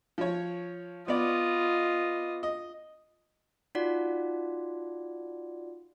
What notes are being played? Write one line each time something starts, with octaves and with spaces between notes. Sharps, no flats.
F3 C#5
B3 F4 D5 D#5
D#5
D#4 F4 F#4 D5 F#5